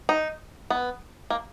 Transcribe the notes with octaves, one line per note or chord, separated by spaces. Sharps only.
D#4
B3
A#3